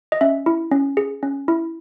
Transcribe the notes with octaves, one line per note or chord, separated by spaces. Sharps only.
D#5
C#4 E5
E4
C#4
G#4
C#4
E4